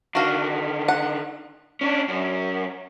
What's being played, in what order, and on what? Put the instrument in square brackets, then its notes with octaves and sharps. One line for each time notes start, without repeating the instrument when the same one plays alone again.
[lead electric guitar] D3 D#3 [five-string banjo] F#4 F5
[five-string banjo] F#5
[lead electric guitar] C#4 D4
F#2